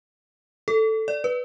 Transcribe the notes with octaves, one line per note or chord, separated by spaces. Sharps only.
A4
D5
B4